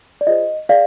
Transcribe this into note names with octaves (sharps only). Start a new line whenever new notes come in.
D5
F4 G#4 C5 D#5
G#4 D5 F5